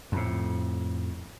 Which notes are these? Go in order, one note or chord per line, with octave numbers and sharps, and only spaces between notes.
F2 A2